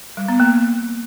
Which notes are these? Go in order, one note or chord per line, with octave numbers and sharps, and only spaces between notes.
G3
B3
A#3